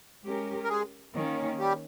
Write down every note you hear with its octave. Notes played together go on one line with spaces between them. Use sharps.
G#3 C#4 G4 A#4
A#4
G#3 G#4
D#3 A#3 C#4
G3 G4